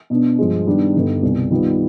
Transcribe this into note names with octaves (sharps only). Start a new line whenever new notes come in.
B2 B3 D4
G2 F3 G#3
D#3 G3 B3 D4
G2 D3 G3 B3 D#4
C2 B2 B3
D#3 G3 B3 F4